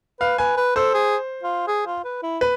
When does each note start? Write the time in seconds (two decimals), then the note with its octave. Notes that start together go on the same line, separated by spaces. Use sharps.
0.20 B4 F5
0.38 B4 G#5
0.57 B4
0.76 A4 C5
0.94 G#4
1.43 F4
1.68 G#4
1.87 F4
2.04 B4
2.23 E4
2.41 B4